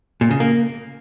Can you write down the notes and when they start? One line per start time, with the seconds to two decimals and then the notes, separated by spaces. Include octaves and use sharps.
0.21 A#2
0.31 C#3
0.40 A#3